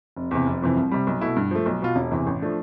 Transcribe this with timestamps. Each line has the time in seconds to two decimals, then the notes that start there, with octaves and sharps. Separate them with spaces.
0.17 F1
0.31 E2 C3
0.46 F1
0.62 F2 C3 E3
0.77 C2
0.91 C3 G3
1.07 B1
1.21 B2 A3 E4
1.36 G2
1.51 F3 A3
1.66 B1
1.82 B2 B3 F4
1.96 E1
2.11 E2 C3 E3
2.27 A1
2.42 F3 A3 D4